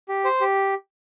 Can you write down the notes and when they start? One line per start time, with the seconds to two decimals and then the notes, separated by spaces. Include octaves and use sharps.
0.08 G4
0.25 C5
0.41 G4